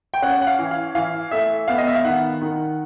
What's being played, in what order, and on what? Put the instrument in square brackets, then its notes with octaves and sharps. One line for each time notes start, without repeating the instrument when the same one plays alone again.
[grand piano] G5
C#4 F#5
F#5
F5
E3
F5
E3 F5
A3 E5
B3 F5
D#5
E5
F5
D#3 F#5
D#3